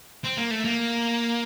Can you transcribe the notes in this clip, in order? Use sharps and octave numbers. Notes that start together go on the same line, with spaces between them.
C4
A#3
A3
A#3